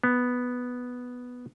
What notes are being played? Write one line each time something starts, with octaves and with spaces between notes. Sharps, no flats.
B3